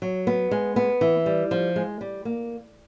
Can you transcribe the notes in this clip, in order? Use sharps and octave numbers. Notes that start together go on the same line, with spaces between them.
F#3
B3
G#3
B3
E3
G3
F3
G#3
G3
A#3